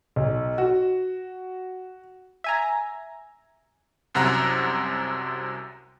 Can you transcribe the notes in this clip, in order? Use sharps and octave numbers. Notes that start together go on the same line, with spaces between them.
B1
F#4
E5 G#5 A#5
C2 F#2 C3 F#5 A#5 F#6